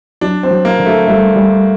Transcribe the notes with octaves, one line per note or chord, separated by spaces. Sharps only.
F#3 D4
C4
F#3
A#3
D3
A3
G3 A3
G3